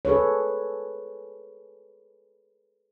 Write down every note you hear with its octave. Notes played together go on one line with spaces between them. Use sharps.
G#4 A4 B4 C#5